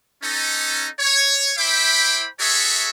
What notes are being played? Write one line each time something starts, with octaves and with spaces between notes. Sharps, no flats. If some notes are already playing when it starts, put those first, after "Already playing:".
C#4 D#4 A4
C#5
E4 C5 E5 G5 B5 D6
F#4 G#4 A4 C#5 E5